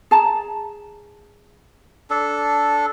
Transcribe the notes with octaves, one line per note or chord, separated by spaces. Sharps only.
G#4 A5 A#5
D4 A4